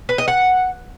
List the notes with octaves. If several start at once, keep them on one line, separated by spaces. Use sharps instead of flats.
B4
D#5
F#5